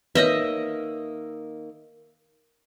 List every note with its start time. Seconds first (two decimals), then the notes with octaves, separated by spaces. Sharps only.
0.15 D#3 A#3 B4 C#5 D#5 E5